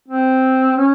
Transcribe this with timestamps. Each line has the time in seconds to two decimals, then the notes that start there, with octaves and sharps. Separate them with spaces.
0.08 C4
0.77 C#4